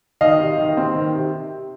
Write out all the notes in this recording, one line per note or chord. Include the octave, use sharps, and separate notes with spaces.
D#3 D#5 F5
C3
D#3
C4
D#3
C3